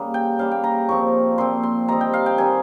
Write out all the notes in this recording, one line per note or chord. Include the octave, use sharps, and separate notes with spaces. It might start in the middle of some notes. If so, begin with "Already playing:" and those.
Already playing: C#3 G3 A#3
G5
C#3 G3 A#3 F5
G5
A#5
A#2 F3 C4 C#6
A#2 F3 C4 C6
C6
D#3 G3 C4 D#4 A#5
G5
F5
G5
D#3 G3 C4 D#4 G#5